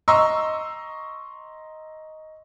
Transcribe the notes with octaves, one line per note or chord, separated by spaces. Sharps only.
D#5 A#5 C6 C#6 E6